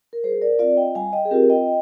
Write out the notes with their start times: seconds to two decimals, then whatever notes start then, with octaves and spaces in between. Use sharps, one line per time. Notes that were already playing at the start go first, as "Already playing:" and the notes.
0.13 A#4
0.24 G3 G#4 C5
0.42 A#4 D5
0.59 C4 F4 D5 F5
0.77 D#5 G5
0.95 G3 F5 G#5
1.13 D#5 G5
1.25 G#4
1.31 C4 F4 G4 A#4
1.50 D#5 G5